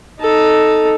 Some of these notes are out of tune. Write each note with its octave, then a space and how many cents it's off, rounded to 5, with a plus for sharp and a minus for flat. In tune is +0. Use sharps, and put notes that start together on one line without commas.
D#4 +0 A4 +0